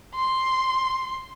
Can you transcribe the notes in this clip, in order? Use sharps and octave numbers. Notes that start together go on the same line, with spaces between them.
C6